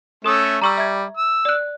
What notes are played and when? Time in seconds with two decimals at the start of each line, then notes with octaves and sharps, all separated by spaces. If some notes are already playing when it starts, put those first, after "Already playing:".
0.24 A3 C#4 A4 E5 D#6
0.61 G3 A#5 C#6 E6
0.78 E5 G#6
1.17 E6
1.45 D5 F#6